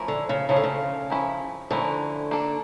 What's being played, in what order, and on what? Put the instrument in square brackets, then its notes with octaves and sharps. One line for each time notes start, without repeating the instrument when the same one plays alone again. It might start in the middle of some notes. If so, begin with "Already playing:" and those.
Already playing: [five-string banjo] F3 A3 C#4 E4 A#4
[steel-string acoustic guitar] D3
C#3
[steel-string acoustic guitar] C#3 [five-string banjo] F3 A3 C#4 E4 A#4
[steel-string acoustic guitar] D3
C#3
[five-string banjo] F3 A3 C#4 E4 A#4
[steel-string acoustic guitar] D3 [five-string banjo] F3 A3 C#4 E4 A#4
[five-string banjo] A#3 D4 A4